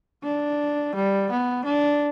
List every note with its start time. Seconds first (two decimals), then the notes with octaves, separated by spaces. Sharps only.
0.23 D4
0.95 G3
1.31 B3
1.65 D4